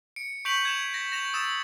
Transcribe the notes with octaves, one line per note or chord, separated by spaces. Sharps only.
C#7 D7
C#6 G6 B6 D7 F7 F#7
G#6 E7 F7
A#6
A#6 E7 F7
D#6 E6 A6 E7